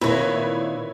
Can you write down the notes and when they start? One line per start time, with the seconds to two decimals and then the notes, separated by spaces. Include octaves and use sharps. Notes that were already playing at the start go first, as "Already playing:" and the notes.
0.01 A#2 D#3 C4 E4 B4 C#5